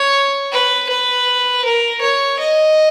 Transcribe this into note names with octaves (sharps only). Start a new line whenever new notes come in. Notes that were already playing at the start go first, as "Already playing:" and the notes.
Already playing: C#5
B4
B4
A#4
C#5
D#5